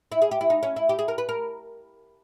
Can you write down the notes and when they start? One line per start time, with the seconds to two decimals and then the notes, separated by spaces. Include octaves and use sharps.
0.12 E4
0.22 G#4
0.31 G4
0.41 E4
0.50 D#4
0.63 C#4
0.76 E4
0.89 G4
0.99 G#4
1.08 A#4
1.18 B4
1.29 A#4